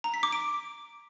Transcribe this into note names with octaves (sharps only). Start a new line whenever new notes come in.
A#5
B6
D6
D7